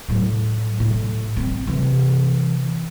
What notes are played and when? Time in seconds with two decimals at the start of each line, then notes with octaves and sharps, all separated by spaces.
0.09 A2 F#3
0.80 A2
1.37 B3 C4
1.67 C3 E3